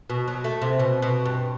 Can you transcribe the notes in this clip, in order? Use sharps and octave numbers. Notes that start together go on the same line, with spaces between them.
B2
F#3
A3
C3
B2
B2
G2